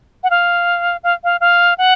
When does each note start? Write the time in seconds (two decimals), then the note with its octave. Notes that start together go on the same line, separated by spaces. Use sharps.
0.23 F#5
0.30 F5
1.03 F5
1.24 F5
1.41 F5
1.78 F#5